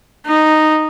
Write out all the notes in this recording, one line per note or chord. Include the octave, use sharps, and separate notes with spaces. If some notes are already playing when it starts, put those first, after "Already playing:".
D#4